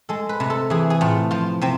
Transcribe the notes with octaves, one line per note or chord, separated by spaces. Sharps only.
G#3 A4
B4
C3
A4
E3 G#4
G#4
A2 F4
F3 F4
C3 C4